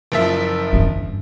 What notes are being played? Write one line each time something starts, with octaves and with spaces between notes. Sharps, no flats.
F#1 F3 E5
E2 G2